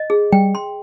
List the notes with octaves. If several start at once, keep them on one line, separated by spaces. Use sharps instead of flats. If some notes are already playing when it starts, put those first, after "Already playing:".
Already playing: D#5
G#4
G3 G5
C6